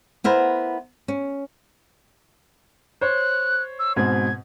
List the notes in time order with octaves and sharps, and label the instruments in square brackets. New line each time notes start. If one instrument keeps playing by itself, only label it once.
[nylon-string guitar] B3 E4 A#4 C5
C#4
[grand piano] C5 C#5 [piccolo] F#6
[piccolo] E6
[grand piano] G#2 B2 C4 [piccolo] G#6